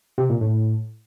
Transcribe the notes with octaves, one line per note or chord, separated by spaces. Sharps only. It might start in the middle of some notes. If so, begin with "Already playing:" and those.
C3
A#2
A2